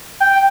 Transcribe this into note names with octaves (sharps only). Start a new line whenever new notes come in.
G5